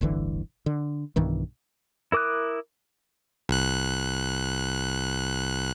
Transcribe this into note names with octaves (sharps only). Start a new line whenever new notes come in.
D1 G1 D3 E3
D3
B1 G2 D#3 E3
E4 A#4 D6 D#6 F#6
C2 F#6